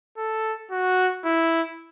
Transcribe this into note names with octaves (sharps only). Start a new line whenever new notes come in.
A4
F#4
E4